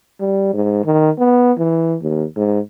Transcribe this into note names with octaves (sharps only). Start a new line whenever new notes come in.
G3
G#2
D#3
B3
E3
D#2
G#2